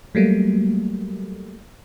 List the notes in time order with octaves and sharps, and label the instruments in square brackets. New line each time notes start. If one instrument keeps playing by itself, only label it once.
[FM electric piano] F#3 G3 A3 A#3